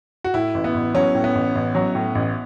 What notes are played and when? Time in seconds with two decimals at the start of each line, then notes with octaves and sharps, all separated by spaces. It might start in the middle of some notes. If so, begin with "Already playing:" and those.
0.24 F#4
0.34 A2 E4
0.54 A1
0.64 B3
0.74 A1
0.94 F#3 C#4
1.15 A2
1.24 B3
1.35 A1
1.55 A1
1.75 F#3
1.95 A2
2.15 A1